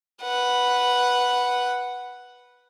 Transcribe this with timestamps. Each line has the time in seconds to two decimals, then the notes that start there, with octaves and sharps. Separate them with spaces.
0.22 B4 F#5